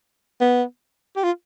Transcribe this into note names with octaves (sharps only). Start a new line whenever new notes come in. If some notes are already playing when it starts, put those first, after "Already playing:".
B3
G4
F4